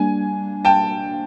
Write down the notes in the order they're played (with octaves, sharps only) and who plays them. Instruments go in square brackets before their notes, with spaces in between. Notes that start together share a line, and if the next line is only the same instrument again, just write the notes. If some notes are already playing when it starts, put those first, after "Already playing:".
Already playing: [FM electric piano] G3 A#3 D4 [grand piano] G#5
[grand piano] G5 A5